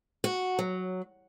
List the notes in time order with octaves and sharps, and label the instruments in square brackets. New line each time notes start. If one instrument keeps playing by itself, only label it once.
[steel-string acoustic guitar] F#4
F#3